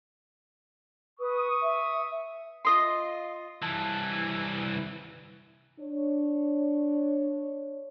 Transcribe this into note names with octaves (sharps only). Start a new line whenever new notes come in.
B4 C#6 D#6
E5
F4 D#5 C6
C2 E3 A5
D4 C#5